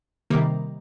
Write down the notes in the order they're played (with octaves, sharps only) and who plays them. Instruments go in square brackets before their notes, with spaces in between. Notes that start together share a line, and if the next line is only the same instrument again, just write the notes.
[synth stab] C3 D#3 G3 A#3